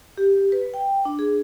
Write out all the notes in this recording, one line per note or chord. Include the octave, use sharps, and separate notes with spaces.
G4
B4
G5
D4
G#4